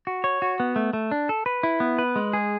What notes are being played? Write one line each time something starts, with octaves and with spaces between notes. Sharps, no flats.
F#4
C#5
F#4
B3
A3
A3
D4
A4
B4
E4
B3
B4
G#3
G#4